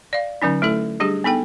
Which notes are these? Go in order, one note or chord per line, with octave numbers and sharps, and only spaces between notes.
D5 F5
D3 F#3 C#4 D#4
A3 E4 A4
G3 D4 G4 G#4
B3 D#4 A4 G5